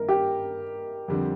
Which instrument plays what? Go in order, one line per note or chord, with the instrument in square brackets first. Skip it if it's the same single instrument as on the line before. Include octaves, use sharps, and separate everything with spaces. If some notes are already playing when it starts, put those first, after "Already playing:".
Already playing: [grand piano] G2 D#3 A#3 D#4 [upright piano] A#4
[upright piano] G4
[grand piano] F2 D3 G3 C4 G4